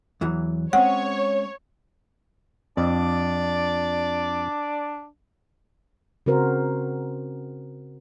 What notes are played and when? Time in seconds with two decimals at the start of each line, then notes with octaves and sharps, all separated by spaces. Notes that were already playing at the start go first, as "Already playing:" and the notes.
0.21 E2 E3 F#3
0.73 G#3 C4 C#4 C#5 F#5
2.77 F2 D4 D5
6.26 C#3 C4 F#4 A#4 C5